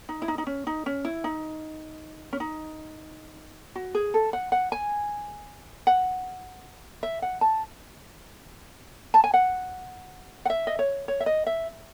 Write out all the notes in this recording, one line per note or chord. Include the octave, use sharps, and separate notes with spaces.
D#4
E4
D#4
D#4
C#4
D#4
C#4
E4
D#4
C#4
D#4
F#4
G#4
A4
F#5
F#5
G#5
F#5
E5
F#5
A5
A5
G#5
F#5
F#5
E5
D#5
C#5
C#5
E5
D#5
E5